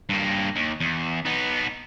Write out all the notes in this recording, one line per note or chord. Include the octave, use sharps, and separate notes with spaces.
G2 A#3
D#2
E2
B3 D#4